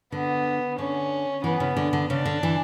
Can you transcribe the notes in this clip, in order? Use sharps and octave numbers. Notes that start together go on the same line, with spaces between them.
D3 B3
D3 C#4
E3 B3
C#3
D3
D3
C#3 D4
D3
E3